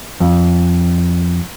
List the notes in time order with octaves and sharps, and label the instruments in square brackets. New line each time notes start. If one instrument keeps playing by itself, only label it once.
[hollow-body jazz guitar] F2